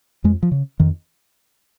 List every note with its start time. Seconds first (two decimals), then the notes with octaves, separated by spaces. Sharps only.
0.24 F2 G#3
0.43 F3
0.52 C#3
0.80 F2 D#3